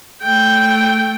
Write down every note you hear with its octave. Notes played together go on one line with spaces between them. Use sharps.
A3 G5